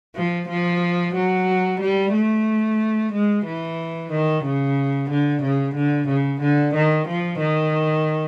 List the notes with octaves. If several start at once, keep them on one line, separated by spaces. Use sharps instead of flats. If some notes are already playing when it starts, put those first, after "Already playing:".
F3
F3
F#3
G3
A3
G#3
E3
D#3
C#3
D3
C#3
D3
C#3
D3
D#3
F3
D#3